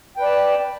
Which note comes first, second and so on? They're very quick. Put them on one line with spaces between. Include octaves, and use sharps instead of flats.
G5 B4 D5 A5